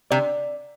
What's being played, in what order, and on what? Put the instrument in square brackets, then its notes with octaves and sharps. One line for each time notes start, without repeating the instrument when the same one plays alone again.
[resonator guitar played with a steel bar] C3 [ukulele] D5